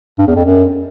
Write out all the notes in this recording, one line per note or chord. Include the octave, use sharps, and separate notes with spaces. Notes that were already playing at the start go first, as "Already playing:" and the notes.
G2
E2
F2
F#2